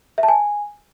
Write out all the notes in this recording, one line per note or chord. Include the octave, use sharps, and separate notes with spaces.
E5
A5
G#5